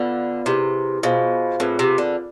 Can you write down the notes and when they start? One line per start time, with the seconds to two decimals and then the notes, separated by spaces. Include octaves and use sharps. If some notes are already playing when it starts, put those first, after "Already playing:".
Already playing: D3 B3 F4 B4 D5
0.46 C3 E4 G#4 B4
1.03 B2 F4 G#4 C5 F5
1.60 A2 C4 F4 G#4 B4
1.79 C3
1.98 D3